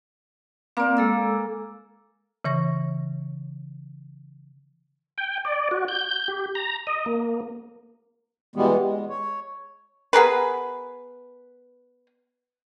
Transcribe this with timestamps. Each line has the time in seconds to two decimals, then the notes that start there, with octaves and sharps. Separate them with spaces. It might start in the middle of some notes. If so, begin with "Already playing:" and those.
0.77 A#3 C4 D5
0.97 G#3 A4 E6
2.44 C#3 E3 C#5 C#6 A#6
5.18 G5
5.45 D5
5.71 F#4
5.88 G6
6.28 G4
6.55 A#5
6.87 D#5
7.06 A#3
8.56 B2 E3 G3 G#3 B3
8.82 G#3
9.09 C#5
10.13 B3 G#4 A#4 B4